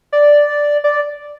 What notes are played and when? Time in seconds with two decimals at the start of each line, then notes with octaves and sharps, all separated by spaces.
0.13 D5
0.84 D5